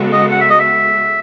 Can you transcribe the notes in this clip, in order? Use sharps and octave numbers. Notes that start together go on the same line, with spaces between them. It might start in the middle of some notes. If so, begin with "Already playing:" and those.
Already playing: C#3 G#3 B3 F#4 A4
D#5
F#5
E5
D#5
E5